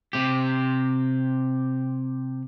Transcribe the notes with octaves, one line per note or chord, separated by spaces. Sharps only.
C3 G4